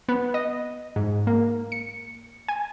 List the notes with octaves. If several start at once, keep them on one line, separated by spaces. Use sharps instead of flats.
B3
D#5
G#2
A#3
C#7
G#5